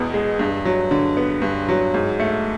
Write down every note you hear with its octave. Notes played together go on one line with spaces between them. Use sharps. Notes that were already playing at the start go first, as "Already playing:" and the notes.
Already playing: E2 B2 G#3 B3
G#3
G2
F#3
D3
B3
G2
F#3
G#2
A3